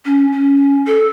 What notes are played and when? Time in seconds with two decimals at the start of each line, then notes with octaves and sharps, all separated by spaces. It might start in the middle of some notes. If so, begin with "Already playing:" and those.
0.05 C#4
0.32 C#4
0.87 A4